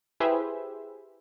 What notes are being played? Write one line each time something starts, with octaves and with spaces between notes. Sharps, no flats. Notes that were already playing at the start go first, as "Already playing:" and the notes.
E4 G4 G#4 B4 C5 E5